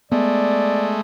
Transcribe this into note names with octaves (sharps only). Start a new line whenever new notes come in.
G#3 A3 B3 D5